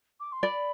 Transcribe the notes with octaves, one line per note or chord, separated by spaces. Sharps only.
D6
C6
D5 B5